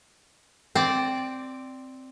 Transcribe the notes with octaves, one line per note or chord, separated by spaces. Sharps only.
C4 D5